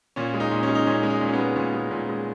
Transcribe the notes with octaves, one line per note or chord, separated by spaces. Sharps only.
A#2 C#4
G#3
D#4
A#2
C#4
G#3
D#4
A#2 C#4
G#3
D#4
A#2
C#4
G#3 B3
A#2 C#4
G#3
A#2
G#3